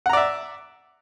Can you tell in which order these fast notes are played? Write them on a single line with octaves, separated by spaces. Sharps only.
F#5 A#5 D5 E5